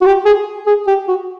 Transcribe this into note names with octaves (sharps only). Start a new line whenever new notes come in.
F#4
G4
G#4
G#4
G4
F#4